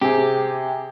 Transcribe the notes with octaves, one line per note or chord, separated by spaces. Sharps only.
C3 G4 G#4